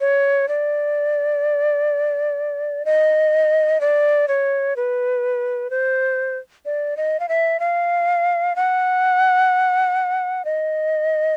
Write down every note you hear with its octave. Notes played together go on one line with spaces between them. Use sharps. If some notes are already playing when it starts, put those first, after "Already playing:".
C#5
D5
D#5
D5
C#5
B4
C5
D5
D#5
F5
E5
F5
F#5
D#5